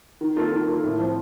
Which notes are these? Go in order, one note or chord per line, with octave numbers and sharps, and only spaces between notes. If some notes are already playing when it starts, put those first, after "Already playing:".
D#3
A#3 F4 A4
D#3
A#3 F4 A4
A2
F3 C4